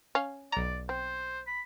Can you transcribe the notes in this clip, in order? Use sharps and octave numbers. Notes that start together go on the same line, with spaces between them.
C#4 F5
B1 D5 A#5
C4 C5
B5